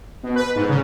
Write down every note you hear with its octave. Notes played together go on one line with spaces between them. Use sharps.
B2
B4
G#2
C#3